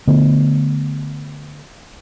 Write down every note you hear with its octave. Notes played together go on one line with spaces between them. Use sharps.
D3 A3 B3